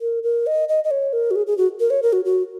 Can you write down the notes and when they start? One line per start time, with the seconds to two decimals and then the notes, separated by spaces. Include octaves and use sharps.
0.01 A#4
0.23 A#4
0.47 D#5
0.69 D#5
0.84 D#5
0.91 C#5
1.13 A#4
1.31 F#4
1.36 G#4
1.47 G#4
1.58 F#4
1.80 A#4
1.90 C#5
2.02 A#4
2.13 F#4
2.25 F#4